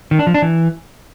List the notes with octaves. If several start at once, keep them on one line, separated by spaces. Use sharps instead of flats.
D#3
D4
F3
D4
E3